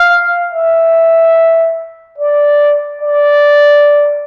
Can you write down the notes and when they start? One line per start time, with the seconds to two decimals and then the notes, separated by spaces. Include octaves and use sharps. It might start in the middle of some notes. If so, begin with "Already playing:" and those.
Already playing: F5
0.52 E5
2.18 D5
3.01 D5